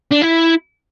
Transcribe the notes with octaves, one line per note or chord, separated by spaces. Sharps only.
D4
E4